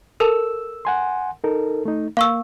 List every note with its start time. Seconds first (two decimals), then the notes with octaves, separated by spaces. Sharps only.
0.20 A4 A#4 A5 E6
0.85 F#5 G#5 C6
1.44 D#4 A4 A#4
1.85 A3 D#4
2.17 A#3 F5 C#6 E6